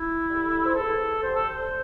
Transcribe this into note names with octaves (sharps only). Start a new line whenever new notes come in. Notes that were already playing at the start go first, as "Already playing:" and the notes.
Already playing: E4
D3 G3
C5
E2 A4
D3 G3 C5
A4
C5